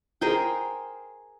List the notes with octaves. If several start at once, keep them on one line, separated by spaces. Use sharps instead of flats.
G#4 A#4 C5 G5